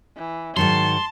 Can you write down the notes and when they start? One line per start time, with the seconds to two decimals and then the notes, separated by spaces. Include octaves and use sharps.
0.17 E3
0.56 G#2 D#3 F#3 A5 C6